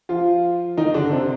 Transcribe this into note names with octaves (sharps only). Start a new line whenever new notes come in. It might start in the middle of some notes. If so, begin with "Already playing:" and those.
F3 F4
D#3 D#4
D3 D4
C3 C4